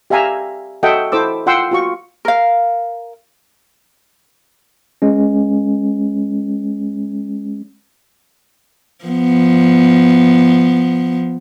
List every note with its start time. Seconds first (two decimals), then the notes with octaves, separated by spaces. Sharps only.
0.10 G4 E5 F5 G#5 A#5
0.83 F#4 A4 D#5 E5 F#5 G5
1.12 E4 A4 C5 D6 E6
1.46 F4 F#5 G5 C6 E6
1.71 F4 F#4 C#6
2.25 A#4 F5
5.02 G#3 C#4
9.05 F3 B3